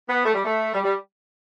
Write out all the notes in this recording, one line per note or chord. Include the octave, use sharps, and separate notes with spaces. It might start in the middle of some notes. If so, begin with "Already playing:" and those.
B3
A3
G3
A3
G3
G3